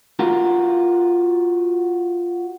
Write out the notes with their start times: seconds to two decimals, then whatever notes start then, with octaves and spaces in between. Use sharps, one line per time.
0.19 F4 F#4 A#4